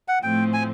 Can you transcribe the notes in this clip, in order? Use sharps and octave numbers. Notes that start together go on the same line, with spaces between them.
F#5
A2 F3 A3 C4 G5
G#5